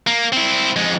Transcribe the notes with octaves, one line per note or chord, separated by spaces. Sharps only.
A#3
C4 E4
F2 G#3